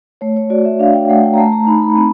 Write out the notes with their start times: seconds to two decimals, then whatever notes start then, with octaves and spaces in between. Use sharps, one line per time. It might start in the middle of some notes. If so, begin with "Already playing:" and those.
0.21 A3 C#5
0.37 C#5
0.50 F#4 D5
0.65 E5
0.79 D4 F5
0.94 G5
1.09 A3 F#5
1.23 G5
1.34 A#5
1.38 A3 A5
1.52 A#5
1.67 D#4 B5
1.82 B5
1.96 C4 B5